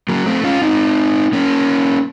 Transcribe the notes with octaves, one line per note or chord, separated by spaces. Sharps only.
F#3 A#3
A3 C4
C#4 F4
C4 D#4
A#3 C#4